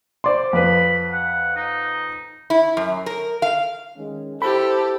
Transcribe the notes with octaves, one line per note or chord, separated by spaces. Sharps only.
C5 D5 C6
F2 B4 B5
F#5
D#4
E4
F#2
A#4
F5
D#3 G#3 C#4
E4 G4 A4 C5 B5